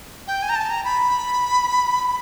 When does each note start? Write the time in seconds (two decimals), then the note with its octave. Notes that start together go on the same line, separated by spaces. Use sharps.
0.27 G5
0.42 G#5
0.49 A#5
0.55 A5
0.70 A#5
0.84 B5